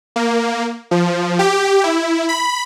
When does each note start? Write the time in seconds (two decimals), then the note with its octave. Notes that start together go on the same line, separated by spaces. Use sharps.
0.16 A#3
0.91 F3
1.39 G4
1.84 E4
2.29 B5